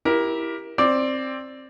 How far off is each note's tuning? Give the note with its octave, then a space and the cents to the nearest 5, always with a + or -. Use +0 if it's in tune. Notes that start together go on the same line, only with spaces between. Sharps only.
E4 +0 G4 +0 A#4 +20
C4 +15 D5 +0